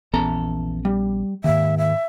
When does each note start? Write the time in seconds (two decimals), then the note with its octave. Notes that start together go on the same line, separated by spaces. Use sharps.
0.13 A#1 E2 B3 C#4 A4 A#5
0.85 G3
1.44 D#2 G#2 D#3 E5
1.78 E5